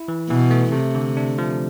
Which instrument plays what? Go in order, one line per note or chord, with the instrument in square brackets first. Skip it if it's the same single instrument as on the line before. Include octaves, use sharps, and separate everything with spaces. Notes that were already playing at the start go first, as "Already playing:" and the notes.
Already playing: [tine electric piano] E4
E3
[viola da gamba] B2 [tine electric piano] E3
[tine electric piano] A3
[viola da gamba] C3 [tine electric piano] A3
[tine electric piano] D3
D4
F3